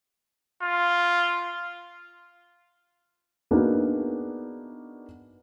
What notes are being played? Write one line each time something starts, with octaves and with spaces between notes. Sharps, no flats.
F4
A#3 B3 D4 D#4 F#4 G#4